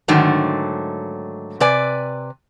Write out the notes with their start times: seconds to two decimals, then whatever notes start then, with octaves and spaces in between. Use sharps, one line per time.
0.08 G#2 D3 D#3 F#3 A3
1.60 C3 B4 D5 G#5